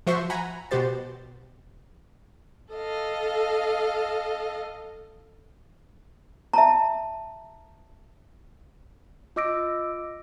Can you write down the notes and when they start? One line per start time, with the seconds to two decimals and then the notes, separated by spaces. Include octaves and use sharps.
0.07 F3 F#4 C5 E5 C6 C#6
0.30 F#5 G#5 A#5 B5
0.71 B2 F#4 G4 C5 A6
2.73 A4 D#5 F5
6.53 E5 A5 A#5
9.36 F4 D#5 D6 E6 A#6 D7